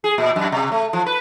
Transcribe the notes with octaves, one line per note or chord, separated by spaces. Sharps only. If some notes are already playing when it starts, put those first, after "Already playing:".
G#4
A#2
F#2
C3
A3
F3
B4